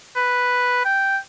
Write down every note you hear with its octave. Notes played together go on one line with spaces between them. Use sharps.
B4
G5